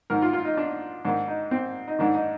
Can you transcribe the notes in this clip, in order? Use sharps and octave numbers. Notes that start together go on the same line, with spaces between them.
G#2 D#3 A#4
F4
F4
D#4
D4
G#2 D#3 D4
D#4
C4
D#4
G#2 D#3 D4
D#4